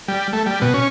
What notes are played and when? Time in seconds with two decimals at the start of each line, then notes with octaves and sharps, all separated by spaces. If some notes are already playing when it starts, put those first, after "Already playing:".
0.08 G3
0.33 A3
0.46 G3
0.62 B2
0.74 C#4